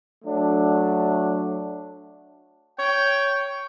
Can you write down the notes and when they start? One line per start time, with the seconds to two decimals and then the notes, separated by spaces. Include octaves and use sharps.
0.25 F#3 A3 D4
2.79 C#5 G5